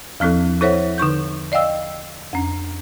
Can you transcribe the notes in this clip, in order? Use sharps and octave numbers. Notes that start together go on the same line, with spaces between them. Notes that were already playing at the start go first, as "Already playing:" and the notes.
E2 F3 C4 E4 A4
E4 A4 C5 C#5 E5 F#5
D3 D#4 C#6 G6
D5 D#5 F5 G5 E6
F2 C#4